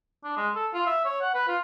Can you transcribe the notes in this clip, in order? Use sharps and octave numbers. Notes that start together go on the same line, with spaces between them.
D4
G#3
A4
F4
E5
C#5
F#5
B4
F4